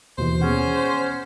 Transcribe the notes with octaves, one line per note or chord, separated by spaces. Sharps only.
D#2 B2 E3 C5
B3 C#4 G#4 F#5